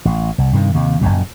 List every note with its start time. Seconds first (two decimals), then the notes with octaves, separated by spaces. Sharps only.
0.05 A1
0.38 C2
0.53 G2 C3 D#3
0.75 D#2 C3
1.01 F#1 B1 F#2 A#2